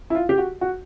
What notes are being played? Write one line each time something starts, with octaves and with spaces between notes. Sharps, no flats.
E4
F4
G4
F#4
F#4